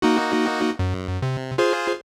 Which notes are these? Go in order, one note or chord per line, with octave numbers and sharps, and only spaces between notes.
A#3 D#4 F#4
F#2
C3
F4 G#4 C5